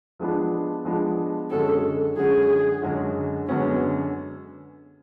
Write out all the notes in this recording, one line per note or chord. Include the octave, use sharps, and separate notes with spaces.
F3 G#3 B3 D4
F3 G#3 B3 D4
F#2 D3 G#3 C#4 F#4 A4
F#2 D3 G#3 C#4 F#4 G#4
F#2 D3 G#3 C#4 F#4
F#2 D3 G#3 B3 C#4 F#4